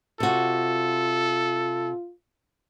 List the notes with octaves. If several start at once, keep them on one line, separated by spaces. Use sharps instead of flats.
C3 F4 F#4 A4